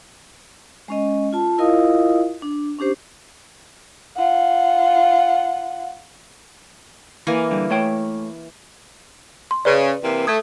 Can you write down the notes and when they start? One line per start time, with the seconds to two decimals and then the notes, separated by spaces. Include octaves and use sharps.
0.88 G#3 C#4 D#5
1.33 F4 A5
1.58 E4 F4 A#4 D#5 F5 D#6
2.42 D4
2.79 C#4 D4 G4 C5
4.17 F4 F#5
7.27 E3 A#3 G#5
7.51 D3 G3
7.71 A3 C#5 G5
9.51 C6
9.65 C#3 B4 D5
10.02 C3 E3 A#3
10.27 A3 D#6 G#6